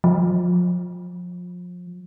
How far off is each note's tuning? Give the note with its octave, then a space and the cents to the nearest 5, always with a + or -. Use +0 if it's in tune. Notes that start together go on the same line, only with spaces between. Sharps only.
F3 +30